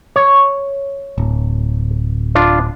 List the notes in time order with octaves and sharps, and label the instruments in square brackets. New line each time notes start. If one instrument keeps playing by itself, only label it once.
[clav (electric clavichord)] C#5
[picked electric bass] D1
[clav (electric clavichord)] D4 F4